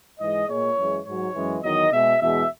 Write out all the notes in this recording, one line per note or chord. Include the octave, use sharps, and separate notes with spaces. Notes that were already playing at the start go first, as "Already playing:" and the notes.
G#2 E3 G#3 D#5
A#2 G#3 C#5
F#2 E3 G#3
G#2 F#3 C#5
F#2 E3 G#3
E2 D#3 F#3 D#5
B2 G#3 E5
E2 B2 G#3 E5